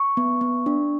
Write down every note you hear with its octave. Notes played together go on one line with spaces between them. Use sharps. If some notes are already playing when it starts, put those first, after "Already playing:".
Already playing: C#6
B3
B3
D4